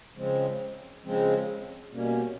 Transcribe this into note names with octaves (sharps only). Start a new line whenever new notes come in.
C#3 F3 G#3 C4
C#3 F3 G#3 C4
B2 G3 A#3 C#4